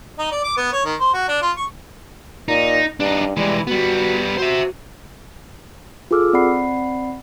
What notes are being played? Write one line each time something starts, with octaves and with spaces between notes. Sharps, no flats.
D#4
D5
D6
B3
C#5
D#3
C5
F#4
D4
F4
C#6
A#2 D#4
G2 D4 D#4
E3 G3 G#3
G3 B3 F#4
F#4 C5 E5
F4 G#4 A4 D6 E6 F6
C4 D5 F#5 B5 C7